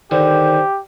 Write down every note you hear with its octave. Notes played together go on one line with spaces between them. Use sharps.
D3 D#3 G4 C5